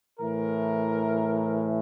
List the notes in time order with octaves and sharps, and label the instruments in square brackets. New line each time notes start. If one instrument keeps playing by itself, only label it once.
[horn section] A2 E3 A#4